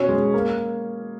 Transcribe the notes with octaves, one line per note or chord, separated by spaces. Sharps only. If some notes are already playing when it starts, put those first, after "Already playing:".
Already playing: B2 C#4
G#3
A#3